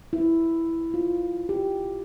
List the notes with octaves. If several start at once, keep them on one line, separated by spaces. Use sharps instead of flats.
E4
F4
G4